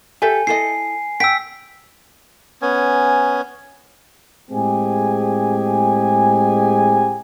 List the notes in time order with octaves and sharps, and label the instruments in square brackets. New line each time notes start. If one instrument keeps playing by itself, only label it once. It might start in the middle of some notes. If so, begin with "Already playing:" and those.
[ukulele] G4 A4 E5 [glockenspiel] G#5
[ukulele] E4 A4 D#5 [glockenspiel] C7
[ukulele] G5 [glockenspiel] E6 B6
[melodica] B3 C#4 G#5
[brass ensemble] A2 G#3 C4 G4 G#4 G#5